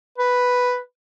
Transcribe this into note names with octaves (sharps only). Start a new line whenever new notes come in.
B4